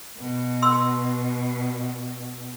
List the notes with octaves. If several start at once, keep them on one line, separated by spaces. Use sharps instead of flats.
B2
C6 E6